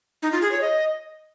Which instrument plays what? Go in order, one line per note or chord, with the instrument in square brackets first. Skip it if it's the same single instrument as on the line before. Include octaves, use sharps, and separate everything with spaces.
[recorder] D#4
F4
G#4
C#5
D#5